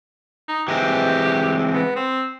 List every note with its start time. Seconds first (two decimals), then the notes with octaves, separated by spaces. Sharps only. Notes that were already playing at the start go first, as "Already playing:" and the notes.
0.48 D#4
0.68 E3 G#3 C4 G4
1.73 B3
1.96 C4